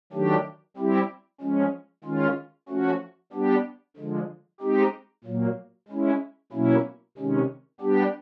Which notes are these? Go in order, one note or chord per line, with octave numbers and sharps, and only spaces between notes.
D#3 F#3 A3 D4 G4
G3 C4 E4 G4
F3 G#3 C#4
D#3 G#3 C#4 F4
F3 A3 C#4 F#4
G3 B3 D4 G4
D3 F3 G#3
G#3 C4 D#4 G4
A#2 F#3 A#3
G#3 C#4 E4
B2 F#3 A#3 C#4 E4
C3 D#3 G#3 C#4
G3 B3 D4 G4